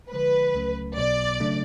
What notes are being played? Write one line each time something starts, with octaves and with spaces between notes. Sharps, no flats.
D3 F3 G#3 B4
C#2 C#3 F#3 A3 C#4
B1 B2 F#3 B3 D5
C#3 F#3 A3 D4